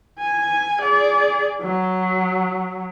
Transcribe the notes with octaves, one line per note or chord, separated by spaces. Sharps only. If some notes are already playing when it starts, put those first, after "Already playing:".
G#5
G#4 D5
F#3